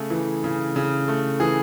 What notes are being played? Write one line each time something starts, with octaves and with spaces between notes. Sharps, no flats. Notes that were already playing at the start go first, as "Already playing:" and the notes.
Already playing: C#3 A3 G#4
E3
C#3
C#3
A3
E3 G#4